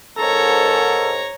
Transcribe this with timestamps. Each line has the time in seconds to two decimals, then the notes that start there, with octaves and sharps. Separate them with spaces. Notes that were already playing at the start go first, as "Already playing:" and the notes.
0.18 G#2 A4 A#4 C#5 A#5